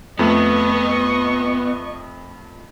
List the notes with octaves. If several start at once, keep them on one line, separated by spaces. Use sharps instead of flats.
F2 A3 B3 D#5 C#6